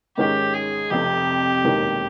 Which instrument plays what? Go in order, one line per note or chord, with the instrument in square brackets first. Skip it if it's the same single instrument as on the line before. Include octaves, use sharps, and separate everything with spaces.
[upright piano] G#2 D#3 G#3 C#4 [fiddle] G4
[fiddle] G#4
[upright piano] F1 F2 C3 [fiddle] G4
[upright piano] E1 D#2 D#3